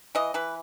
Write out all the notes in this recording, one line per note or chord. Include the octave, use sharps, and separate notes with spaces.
E3 D#5
E3 B4